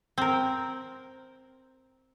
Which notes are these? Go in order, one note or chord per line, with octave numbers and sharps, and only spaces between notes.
C4 A#4